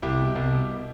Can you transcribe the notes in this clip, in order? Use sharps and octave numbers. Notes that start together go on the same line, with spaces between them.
C2 E4 G4
B2
C2
B2